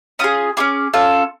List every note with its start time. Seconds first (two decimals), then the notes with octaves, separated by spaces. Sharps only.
0.19 C#4 F4 G#4 D#6
0.57 C#4 F4 G#4 D6
0.94 C#4 F4 A4